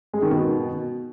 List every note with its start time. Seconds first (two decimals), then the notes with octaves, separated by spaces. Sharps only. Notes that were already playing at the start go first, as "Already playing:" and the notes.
0.13 G#3
0.22 D#3
0.31 B2